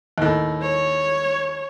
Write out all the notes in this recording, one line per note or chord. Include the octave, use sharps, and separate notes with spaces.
D#2 A2
C#5